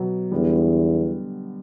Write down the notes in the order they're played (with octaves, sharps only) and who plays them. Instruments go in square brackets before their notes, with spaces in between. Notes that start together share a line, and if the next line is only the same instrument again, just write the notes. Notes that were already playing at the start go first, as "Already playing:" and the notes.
Already playing: [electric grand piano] B2 F#3 B3
[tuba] E2 [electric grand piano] D3 G3 B3